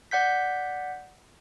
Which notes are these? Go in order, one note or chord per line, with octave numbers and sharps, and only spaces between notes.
D5 F#5 G6 B6